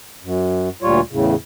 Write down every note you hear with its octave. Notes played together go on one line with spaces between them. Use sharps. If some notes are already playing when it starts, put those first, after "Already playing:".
F#2
D2 A#2 G3 F4 C#5
E2 A2 C#3